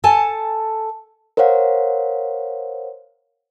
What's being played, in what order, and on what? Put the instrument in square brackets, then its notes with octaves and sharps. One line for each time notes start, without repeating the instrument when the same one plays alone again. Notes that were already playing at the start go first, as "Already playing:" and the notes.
[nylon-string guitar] A4 G#5 A5
[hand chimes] A#4 C5 C#5 F5 F#5